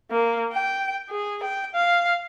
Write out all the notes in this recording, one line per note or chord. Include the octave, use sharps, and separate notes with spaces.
A#3
G5
G#4
G5
F5